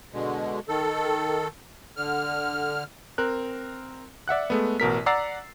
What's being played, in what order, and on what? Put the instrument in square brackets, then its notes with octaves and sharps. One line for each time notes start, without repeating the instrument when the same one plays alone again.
[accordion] B2 D3 G#3
D#3 A4
D3 F6
[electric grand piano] C4 A#4 F#6
D5 E5 F#5 F#6
G#3 A3 B3
A1 B2 A#4 B6
D5 F#5 A#5 E6 A6 C7